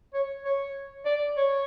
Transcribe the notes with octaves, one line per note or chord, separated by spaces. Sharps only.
C#5
C#5
D5
C#5